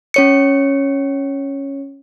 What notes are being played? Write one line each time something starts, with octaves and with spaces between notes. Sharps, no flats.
C#4 C#5 C#7